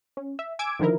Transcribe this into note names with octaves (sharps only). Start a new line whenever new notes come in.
C#4
E5
G#5 D6 E6 G#6 D7
D3 D#3 F3 E4 A#4